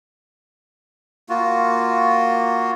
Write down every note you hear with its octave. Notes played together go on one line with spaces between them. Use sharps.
A#3 F4 F#4